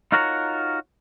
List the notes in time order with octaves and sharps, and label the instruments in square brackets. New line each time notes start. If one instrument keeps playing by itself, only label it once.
[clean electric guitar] D#4 F4 F#4 A#4 C#5 A#5